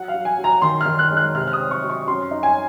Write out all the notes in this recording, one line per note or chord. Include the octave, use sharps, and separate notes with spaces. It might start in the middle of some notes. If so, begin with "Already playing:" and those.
Already playing: F#3 F#5
F5
F#3
G#5
F#3
A#5
D#3 C6
F6
D#3
F#6
G#3
F#6
C3 F6
F6
D#6
C4
C#6
F#3
C#6
F#2 C6
D#4
G#5